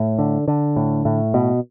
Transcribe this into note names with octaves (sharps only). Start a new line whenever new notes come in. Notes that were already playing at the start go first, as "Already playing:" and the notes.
Already playing: A2
D3
D3
A2
A2
B2